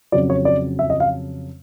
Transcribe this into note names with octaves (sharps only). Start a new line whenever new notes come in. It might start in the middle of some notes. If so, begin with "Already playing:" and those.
F2 C#3 F#3 D5
C#5
D5
E5
D#5
F5